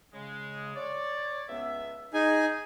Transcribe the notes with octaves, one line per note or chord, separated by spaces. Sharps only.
C#3 G#3
C#5 D5
C#2 B3 E5
D#4 G#4 G#5